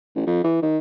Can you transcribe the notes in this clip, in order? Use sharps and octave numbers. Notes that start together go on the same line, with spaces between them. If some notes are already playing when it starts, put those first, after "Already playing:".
A1
F2
E3
D#3